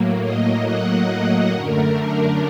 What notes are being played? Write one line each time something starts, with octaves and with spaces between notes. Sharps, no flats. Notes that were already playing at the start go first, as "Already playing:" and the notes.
Already playing: A2 F#3 A#3
D#5
F#5
F#2 D3 A3 A#4
D4